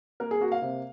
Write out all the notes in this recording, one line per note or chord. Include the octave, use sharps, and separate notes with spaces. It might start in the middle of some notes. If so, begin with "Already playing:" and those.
A#3 A#4
G#4
A#3 F#4
F5
C3